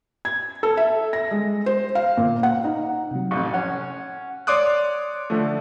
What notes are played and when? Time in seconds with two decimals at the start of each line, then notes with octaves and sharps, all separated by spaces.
0.25 G#6
0.63 A4
0.77 E5
1.13 A#6
1.31 G#3
1.66 C5
1.95 F5
2.17 A#2
2.43 F#5
2.64 D#4
3.11 C3 F#3
3.31 A1 F2 C#6
3.54 C#4 F#5
4.47 C#5 D5 C6 D6 D#6 F#6
5.30 D3 F3 A3